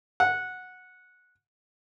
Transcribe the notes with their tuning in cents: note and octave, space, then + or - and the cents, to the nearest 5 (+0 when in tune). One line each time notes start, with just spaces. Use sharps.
F#5 -10